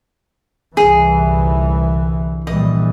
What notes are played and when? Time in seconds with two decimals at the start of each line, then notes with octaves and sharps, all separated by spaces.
0.77 G1 C2 E3 G#4
2.47 A#1 E3 G3 D#5